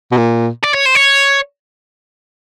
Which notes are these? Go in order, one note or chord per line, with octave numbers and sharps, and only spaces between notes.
B2
A#2
D5
C#5
C5
C#5